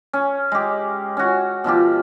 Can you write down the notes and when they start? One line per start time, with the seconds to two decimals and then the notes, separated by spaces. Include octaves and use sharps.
0.13 C#4
0.52 G#3 G4
1.17 C#4 F#4
1.64 B2 F3 F4 G4